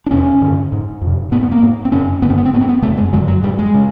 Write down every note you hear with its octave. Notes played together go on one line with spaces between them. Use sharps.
D4
E2 C3 C#4
G2 D3
G#2
F2
C3
G#2 B3
B3
A#3
G#2
C4
F#2 C#3 C#4
G2 D3 B3
C4
B3
C4
G#2 B3
C4
B3
C#3 A3
F#2
G#3
F#2 D3 F#3
F#3
G#2 G3
G#3
C#3